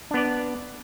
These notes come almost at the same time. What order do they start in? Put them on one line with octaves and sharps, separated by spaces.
D4 B3 D5